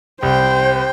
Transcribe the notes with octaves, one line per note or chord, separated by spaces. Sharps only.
C2 C5 G5